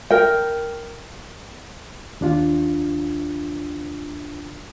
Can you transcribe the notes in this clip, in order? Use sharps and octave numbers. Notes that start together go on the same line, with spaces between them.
A#4 G5
D#2 D4 F4